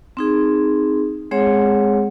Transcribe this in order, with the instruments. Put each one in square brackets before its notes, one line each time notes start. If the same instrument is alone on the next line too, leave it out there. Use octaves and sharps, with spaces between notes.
[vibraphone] C4 D#4 G#4
G#3 C4 G#4 C#5 F#5